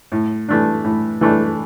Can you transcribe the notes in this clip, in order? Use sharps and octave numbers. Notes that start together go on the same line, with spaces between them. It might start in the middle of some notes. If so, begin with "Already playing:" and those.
A2
E3 A3 D4
A2
E3 A3 D4